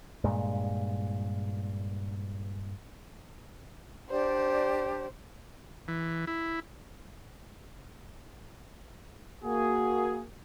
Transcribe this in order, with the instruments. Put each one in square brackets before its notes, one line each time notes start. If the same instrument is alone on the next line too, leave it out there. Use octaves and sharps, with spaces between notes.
[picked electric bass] G2 A#2 G#3
[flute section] D4 G4 D5 [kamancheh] C5
[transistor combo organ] E3
E4
[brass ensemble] A#3 F#4 G#4